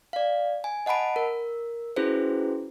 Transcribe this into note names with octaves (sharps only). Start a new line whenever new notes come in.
D5 F5
G#5
D#5 F#5 A5 B5 D7
A#4
C#4 E4 F#4 G#4 B4 C5